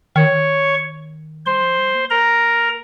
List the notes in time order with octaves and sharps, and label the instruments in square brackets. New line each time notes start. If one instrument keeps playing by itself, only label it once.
[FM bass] D#3 [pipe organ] C#5 C#6
[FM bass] G3 [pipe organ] C5 C6
[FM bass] F3
G3
A#3
[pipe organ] A#4 A#5